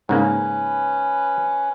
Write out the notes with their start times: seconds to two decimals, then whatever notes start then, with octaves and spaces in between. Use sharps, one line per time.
0.09 G#2 C#3 A#3 C#4 B4